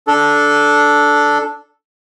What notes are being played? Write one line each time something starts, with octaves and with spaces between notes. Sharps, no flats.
D4 A4